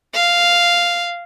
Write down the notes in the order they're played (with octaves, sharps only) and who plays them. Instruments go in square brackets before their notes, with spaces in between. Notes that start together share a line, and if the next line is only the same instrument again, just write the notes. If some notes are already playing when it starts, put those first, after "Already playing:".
[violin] F5